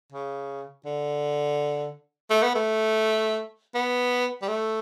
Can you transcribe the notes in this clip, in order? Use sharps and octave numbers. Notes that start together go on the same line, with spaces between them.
C#3
D3
A3
B3
A3
B3
G3
A3